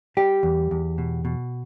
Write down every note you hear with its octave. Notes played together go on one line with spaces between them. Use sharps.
G3 G4
E2
E2
B2
B2